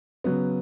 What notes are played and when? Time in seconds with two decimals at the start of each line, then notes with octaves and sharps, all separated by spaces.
0.24 C#3 F#3 B3